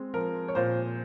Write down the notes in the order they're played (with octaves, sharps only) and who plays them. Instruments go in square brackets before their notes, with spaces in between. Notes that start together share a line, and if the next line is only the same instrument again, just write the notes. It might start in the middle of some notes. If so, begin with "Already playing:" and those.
Already playing: [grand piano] G#3 C4
[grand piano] F3 [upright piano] A#4
[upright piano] C#5
[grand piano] A#2 [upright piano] C5